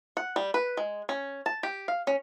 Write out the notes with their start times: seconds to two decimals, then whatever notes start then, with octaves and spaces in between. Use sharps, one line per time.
0.17 F#5
0.36 G3
0.54 B4
0.77 G#3
1.09 C#4
1.46 A5
1.63 G4
1.88 F5
2.07 C#4